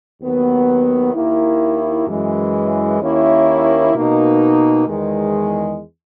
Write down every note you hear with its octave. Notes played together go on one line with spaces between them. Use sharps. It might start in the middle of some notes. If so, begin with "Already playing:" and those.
D#2 D#3 F#3 B3
D#2 D#3 A#3 E4
F#2 E3 G#3
D#2 D#3 A#3 C#4 E4
B2 A#3 D#4
E2 D#3 G#3